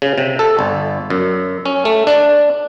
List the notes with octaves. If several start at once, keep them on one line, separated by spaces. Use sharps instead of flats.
C#3
C3
A4
G1
F#2
C#4
A3
D4